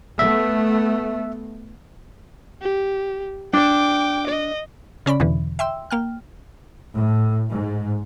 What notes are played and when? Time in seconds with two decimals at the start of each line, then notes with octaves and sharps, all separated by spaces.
0.19 A3 B3 E5
2.62 G4
3.53 D4 G5 D6
4.27 D#5
5.06 C#3 C#4 D5 B5
5.20 E2 B2 D3 E3
5.59 E5 G5 C6 E6
5.91 A#3 G5 F6
6.94 A2
7.51 G#2